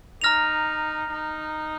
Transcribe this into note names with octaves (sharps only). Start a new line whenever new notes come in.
D#4 A#5 F6 A#6 F7
D#4